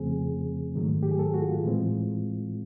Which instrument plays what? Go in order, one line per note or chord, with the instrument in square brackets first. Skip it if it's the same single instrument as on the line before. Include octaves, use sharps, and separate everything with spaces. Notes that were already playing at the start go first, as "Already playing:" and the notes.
Already playing: [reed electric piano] F2 C#3 F3 A3 C4 G#4
G#2 D#3 F#3 A3
G4
G#4
A4
F#4
F4
A2 E3 G#3 C4